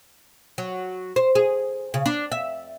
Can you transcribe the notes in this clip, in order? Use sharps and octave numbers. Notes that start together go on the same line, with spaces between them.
F#3
C5
G#4
C#3
D4
E5